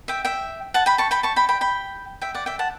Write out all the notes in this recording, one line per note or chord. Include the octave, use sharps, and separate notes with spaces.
E5 G5
E5 G5
F#5 A5
G5 B5
A5 C#6
G5 B5
A5 C#6
G5 B5
G5 B5
G5 B5
E5 G5
D5 F#5
E5 G5
F#5 A5